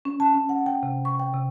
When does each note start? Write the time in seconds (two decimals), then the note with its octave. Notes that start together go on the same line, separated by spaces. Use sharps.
0.05 C#4
0.20 A5
0.34 C#4
0.49 F#5
0.66 G5
0.83 C3
1.05 C#6
1.20 G5
1.34 C3